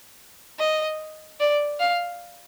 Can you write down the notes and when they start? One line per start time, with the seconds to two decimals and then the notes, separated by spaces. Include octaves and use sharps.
0.59 D#5
1.40 D5
1.80 F5